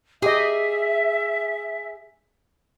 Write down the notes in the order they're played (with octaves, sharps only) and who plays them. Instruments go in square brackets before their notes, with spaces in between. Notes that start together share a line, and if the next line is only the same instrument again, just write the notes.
[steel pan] G4 D#5 [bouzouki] G#4 [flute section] E5